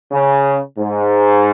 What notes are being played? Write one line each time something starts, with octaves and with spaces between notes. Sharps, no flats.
C#3
G#2